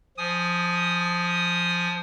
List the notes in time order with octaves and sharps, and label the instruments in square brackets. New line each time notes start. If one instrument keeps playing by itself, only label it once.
[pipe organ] F3 G#5 D#6